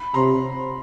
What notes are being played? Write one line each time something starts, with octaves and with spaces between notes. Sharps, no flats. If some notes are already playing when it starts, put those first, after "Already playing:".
Already playing: B5
C3 A#5 C6